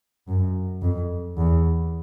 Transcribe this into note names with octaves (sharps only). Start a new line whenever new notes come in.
F#2
F2
E2